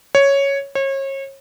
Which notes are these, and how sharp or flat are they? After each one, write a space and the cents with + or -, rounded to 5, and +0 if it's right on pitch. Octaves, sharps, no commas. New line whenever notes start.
C#5 +0
C#5 -35